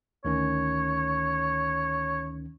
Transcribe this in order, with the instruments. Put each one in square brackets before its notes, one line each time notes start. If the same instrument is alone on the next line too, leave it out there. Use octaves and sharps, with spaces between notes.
[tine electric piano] D2 D#3 C#4 [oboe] C#5